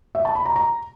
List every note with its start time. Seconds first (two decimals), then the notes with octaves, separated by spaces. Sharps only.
0.15 E5
0.25 A5
0.35 B5
0.46 A#5
0.56 A#5